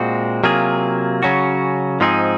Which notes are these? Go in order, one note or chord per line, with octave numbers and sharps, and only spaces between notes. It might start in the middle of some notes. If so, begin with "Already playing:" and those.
Already playing: A#2 G#3 C4 F#4
C3 F#3 A#3 F4 G#4
C#3 F#3 C#4 F#4
G#2 F3 C4 D#4 G#4